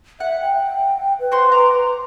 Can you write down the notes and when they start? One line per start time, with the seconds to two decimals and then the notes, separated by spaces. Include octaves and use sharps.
0.20 E5 F#5
0.41 G5
1.20 B4
1.32 F#4 C5 C6
1.52 A#5 D6